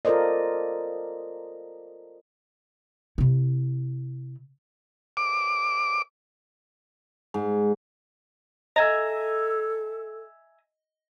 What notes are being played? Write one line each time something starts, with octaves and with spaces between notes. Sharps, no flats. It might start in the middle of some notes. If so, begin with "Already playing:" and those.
F4 A4 A#4 C5 D5 D#5
C3 E4
D6
G#2
A4 D#5 E5 G#5 A#5